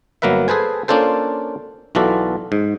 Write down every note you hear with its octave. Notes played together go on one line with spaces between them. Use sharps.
G1 F#3 A#3 A#4 B4 E5
G#4 A4 B4 C5 G#5
A#3 C#4 D4 F4 A4 C5
B1 E3 F4 F#4 A4 D5
G#2